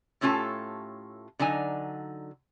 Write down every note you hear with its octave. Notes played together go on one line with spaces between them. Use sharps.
A2 A3 C#4 F4 G4 A4
D3 F#3 D#4 G#5